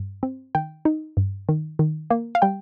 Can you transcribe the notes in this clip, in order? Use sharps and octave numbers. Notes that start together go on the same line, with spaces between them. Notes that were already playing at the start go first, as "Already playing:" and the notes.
Already playing: G2
C4
D#3 G5
D#4
G2
D#3
D#3
A#3
F5
G3 G5